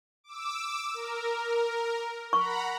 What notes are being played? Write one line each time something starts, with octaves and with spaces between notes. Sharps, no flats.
D6 E6
A#4
F#5 A#5 B5 C#6